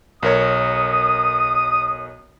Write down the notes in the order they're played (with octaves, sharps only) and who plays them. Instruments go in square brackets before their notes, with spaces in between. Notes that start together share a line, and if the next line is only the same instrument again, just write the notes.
[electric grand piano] B1 A#4 C#5 [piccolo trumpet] D#6